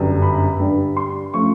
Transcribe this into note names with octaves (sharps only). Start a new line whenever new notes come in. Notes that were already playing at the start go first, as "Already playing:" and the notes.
Already playing: G1 F#2 D3 G3
B5
G2 D3 G3
C6
F3 A3 C#4 C#6